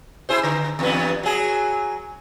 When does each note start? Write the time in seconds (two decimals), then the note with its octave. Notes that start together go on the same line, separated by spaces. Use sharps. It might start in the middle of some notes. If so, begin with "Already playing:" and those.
0.29 E4 G#4 C5
0.43 D3
0.79 E2 G2 B3
1.23 F#3 G#4